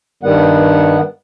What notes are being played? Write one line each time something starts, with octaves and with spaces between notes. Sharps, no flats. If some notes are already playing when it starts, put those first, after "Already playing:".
G2 D#3 G3 B3 F#5